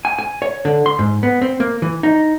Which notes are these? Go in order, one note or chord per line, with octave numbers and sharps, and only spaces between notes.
G#5
G#5
C#5
D3
C6
G#2
B3
C4
A#3
E3
D#4